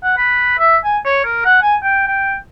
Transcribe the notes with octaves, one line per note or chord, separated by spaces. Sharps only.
F#5
B4
E5
G#5
C#5
A#4
F#5
G#5
G5
G5